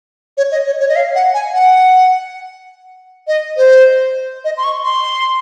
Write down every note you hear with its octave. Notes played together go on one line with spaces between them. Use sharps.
C#5
D#5
C#5
C#5
D#5
F5
F#5
G#5
F#5
D#5
C5
D#5
C6
C#6
C6